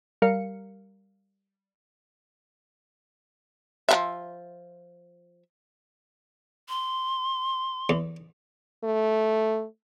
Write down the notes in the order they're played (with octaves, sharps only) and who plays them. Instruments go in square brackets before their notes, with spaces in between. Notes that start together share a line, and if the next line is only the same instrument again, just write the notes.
[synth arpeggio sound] G3 A#4 F5 C#7
[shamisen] F3 C5 E5
[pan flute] C6
[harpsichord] E2
[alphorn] A3